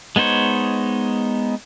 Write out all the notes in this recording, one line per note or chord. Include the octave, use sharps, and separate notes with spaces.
G#3 B3 D#4 C5 C#5